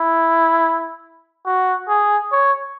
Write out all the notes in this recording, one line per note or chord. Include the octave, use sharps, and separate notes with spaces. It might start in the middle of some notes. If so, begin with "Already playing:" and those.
Already playing: E4
F#4
G#4
C#5